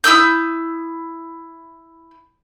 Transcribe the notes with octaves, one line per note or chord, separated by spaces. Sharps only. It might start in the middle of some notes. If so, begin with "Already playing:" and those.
E4 D#6 E6 G6